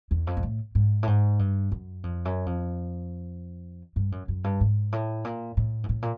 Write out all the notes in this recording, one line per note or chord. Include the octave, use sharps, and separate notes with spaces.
E2
F2
G#2
A2
G#2
A2
G#2
G2
F#2
F2
F#2
F2
G2
F#2
F#2
G2
G#2
A2
A#2
A2
G#2
A2
A#2